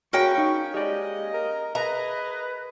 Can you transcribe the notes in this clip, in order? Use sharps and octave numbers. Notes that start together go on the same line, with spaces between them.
A#3 C#4 F#4 G#4 F5 G5 B5 C#6
D#4
G#3 G4 D5 D#5
A#4
G#4 A#4 B4 D#5 E5 A#5